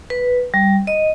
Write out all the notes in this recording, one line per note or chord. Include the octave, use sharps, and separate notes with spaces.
B4
G3
D#5